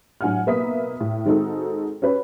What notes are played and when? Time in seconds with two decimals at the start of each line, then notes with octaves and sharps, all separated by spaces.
0.21 A2 F#3 D4 F#5 G#5 F6
0.47 B1 A#3 B4 E5 D#6 B6
1.00 A2
1.26 D#3 G#3 C4 D#4 F#4 A4
2.02 C#4 F#4 G4 B4 C#5